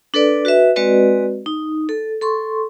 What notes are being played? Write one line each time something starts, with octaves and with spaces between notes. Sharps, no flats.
D4 A4 B4 D5
F#4 B4 D#5 E5
G#3 C4 F#4 B4 D5 D#5
D#4
A4
A4 C6 C#6